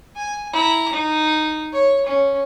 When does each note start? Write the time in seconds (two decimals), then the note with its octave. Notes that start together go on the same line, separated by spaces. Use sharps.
0.16 G#5
0.52 E4 A#5
0.93 D#4
1.72 C#5
2.06 C#4